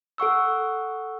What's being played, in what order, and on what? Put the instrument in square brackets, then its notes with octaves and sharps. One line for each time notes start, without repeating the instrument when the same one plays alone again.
[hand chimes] A4 F#5 C#6 E6